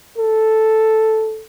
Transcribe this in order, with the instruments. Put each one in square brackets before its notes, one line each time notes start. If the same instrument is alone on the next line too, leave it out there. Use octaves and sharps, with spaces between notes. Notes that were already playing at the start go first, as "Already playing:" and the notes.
[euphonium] A4